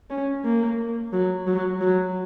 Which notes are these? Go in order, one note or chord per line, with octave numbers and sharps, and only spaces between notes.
C#4
A#3
F#3
F#3
F#3